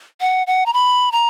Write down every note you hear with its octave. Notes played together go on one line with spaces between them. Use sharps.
F#5
F#5
A#5
B5
A#5